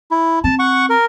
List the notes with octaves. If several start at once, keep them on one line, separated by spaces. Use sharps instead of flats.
E4
C4 A5
F#5 C#6
A#4